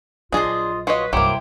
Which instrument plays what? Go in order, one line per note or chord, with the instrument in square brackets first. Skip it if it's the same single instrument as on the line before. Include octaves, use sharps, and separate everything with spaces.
[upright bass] A#1 F#3 [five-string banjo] D4 G#4 [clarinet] F4 [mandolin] C5 C#5 D#5
[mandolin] F4 [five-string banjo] F#4 C#5 D#5 [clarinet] B4
[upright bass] C2 G2 [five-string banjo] F#3 A#3 [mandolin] E4 G4 C5 [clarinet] D6